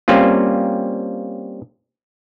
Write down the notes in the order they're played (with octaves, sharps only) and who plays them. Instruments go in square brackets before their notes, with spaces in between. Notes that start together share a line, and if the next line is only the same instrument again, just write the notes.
[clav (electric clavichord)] G3 A#3 C4 C#4 F4